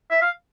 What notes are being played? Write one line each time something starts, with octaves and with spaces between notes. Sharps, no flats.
E5
F5